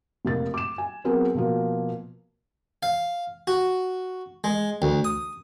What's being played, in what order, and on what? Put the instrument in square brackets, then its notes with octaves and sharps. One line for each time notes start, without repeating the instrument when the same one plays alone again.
[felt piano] F1 A#3 A6
D6 E7
G#5
F#3 B3 C4 G#4 A#4
B2 F3 A#3
[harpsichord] F5
F#4
G#3
D2
D#6